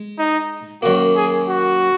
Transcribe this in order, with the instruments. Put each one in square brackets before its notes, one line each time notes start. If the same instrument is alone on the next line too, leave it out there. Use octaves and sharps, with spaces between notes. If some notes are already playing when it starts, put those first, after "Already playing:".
Already playing: [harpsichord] G#3
[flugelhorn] D#4
[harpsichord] F#2 D#3 A#3 [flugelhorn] F#4
[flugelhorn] G#4
F#4